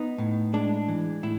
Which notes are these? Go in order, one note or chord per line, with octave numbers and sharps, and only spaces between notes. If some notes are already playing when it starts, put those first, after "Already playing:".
Already playing: B3 D#4
A2
G#3 D4
E3
A2 E4